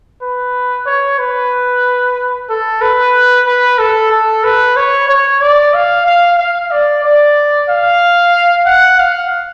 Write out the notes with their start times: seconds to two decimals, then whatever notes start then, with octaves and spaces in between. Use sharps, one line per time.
0.22 B4
0.87 C#5
1.19 B4
2.49 A4
2.81 B4
3.47 B4
3.79 A4
4.12 A4
4.44 B4
4.77 C#5
5.09 C#5
5.41 D5
5.74 F5
6.06 F5
6.39 F5
6.71 D5
7.04 D5
7.69 F5
8.66 F#5
8.99 F5